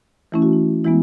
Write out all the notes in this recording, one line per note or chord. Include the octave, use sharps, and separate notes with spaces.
E3 A3 C#4 E4
F#4
E4
E3 G#3 B3 E4